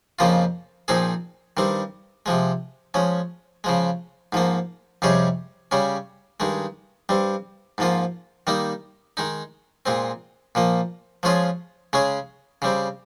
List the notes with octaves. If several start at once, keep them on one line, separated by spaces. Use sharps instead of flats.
F2 C#3 F3 A#3 F4
A#2 F3 C4 D#4 G#4
G2 D#3 G3 C4
C3 F3 G#3
F3 G#3 C#4
C#3 F3 G#3
G#2 F3 A#3
F2 C3 G3 C#4 G#4
C#3 G3 C#4
G2 D#3 G#3
G2 G3 C4
G#2 F3 A#3 F4
D#3 G3 A#3 D#4
D#3 G#3 D#4
A#2 G#3 C4
A#2 F3 A#3
F3 G#3 C#4 F4 G#4
C#3 G#3 C#4 G#4
C#3 G3 C4